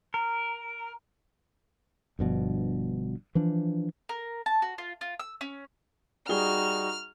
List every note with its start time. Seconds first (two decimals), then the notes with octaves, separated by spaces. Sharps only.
0.14 A#4
2.19 G1 G2 B2 F3
3.35 E3 F3 D4
4.09 A#4
4.46 A5
4.62 F#4
4.78 F4
5.01 F4
5.19 E6
5.41 C#4
6.29 G3 D#4 F#4 G#4 F6 G7